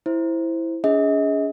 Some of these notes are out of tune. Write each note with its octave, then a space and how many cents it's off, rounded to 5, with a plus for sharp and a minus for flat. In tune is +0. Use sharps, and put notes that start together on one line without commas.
E4 +0 C5 +0
C#4 +45 G#4 +0 D#5 +40